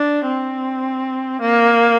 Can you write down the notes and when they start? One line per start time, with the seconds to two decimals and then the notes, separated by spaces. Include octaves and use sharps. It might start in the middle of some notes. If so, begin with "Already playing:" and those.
Already playing: D4
0.26 C4
1.41 A#3